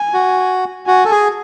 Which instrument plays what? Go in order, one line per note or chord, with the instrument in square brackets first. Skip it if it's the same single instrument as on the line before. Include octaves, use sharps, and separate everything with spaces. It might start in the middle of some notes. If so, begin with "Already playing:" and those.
Already playing: [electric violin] G#5
[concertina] F#4
[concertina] F#4 [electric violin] G#5
[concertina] A4
G#4